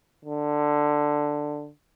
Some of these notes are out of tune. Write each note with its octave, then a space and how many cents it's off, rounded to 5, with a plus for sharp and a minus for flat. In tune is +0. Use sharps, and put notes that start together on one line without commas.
D3 +10